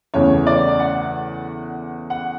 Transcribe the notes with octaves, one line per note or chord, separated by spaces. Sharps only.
E2 C#3 E3 A3 C#4 C#5
D5
F#5
F#5